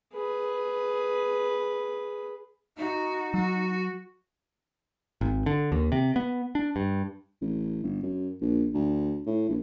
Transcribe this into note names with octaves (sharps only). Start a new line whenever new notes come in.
G#4 B4
D#4 F#4
F#3 F#4
G#1
D3
D#2
C3
B3
D4
G2
A1
G1
F#2
A#1
D2
A2
A#1